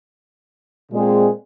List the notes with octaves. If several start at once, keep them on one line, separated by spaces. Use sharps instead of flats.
A#2 G#3 C4